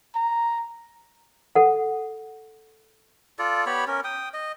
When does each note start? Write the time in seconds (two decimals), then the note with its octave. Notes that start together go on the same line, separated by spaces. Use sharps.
0.15 A#5
1.55 A4 F#5
3.39 F4 A4 D5
3.66 B3 G4 C#5 B5
3.88 C#4 A#4
4.04 G5 D#6
4.34 D#5